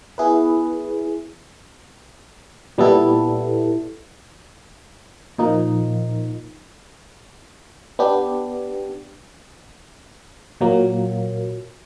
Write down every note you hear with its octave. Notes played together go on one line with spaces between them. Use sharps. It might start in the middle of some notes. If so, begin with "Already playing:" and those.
B3 E4 G#4 B4
A#2 G3 B3 E4 A4
A#2 F3 A#3 D#4
B3 D4 G4
A#2 F#3 A#3